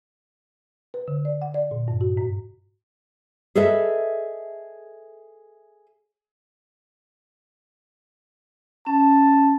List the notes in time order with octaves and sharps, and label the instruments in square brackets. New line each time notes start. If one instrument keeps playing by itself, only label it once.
[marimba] B4
D3
D5
F#5
D5
A#2
G2
F#4
G#2
[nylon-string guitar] G#4 A4 B4 D#5 E5
[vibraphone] C#4 [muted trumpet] A5